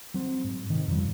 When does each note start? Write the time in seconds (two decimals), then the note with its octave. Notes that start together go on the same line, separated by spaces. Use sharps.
0.14 F#3 C4
0.44 G#2
0.70 C3 D#3
0.87 F2 G#2 F3 G3